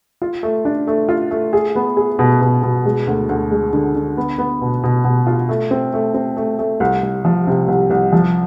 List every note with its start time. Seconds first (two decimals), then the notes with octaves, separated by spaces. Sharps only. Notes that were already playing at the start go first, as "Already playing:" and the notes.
0.22 F4
0.43 A3
0.65 D4
0.87 A3
1.09 F4
1.31 A3
1.53 G#4
1.75 B3
1.97 G#4
2.19 B2
2.41 B2
2.63 B2
2.85 G#3
3.07 D2
3.29 D2
3.51 G#3
3.73 D3
3.95 D3
4.17 B3
4.38 B3
4.61 B2
4.83 B2
5.04 B2
5.26 F4
5.49 A3
5.71 C4
5.93 A3
6.14 C4
6.37 A3
6.59 A3
6.80 C2
7.03 C2
7.25 F3
7.47 C3
7.68 C2
7.90 C2
8.12 F3